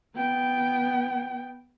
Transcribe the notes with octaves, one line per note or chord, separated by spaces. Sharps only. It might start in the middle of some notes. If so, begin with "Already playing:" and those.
B3 G5